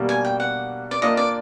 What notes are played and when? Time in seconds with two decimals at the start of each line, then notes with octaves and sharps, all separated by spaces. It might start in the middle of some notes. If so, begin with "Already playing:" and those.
Already playing: B2 G3 A#3 D4
0.09 G#5
0.25 G5
0.40 F#5
0.91 D5
1.02 A#3 D4 F4 D#5
1.17 D5